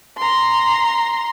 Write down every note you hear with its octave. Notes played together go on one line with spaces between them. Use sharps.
A#5 C6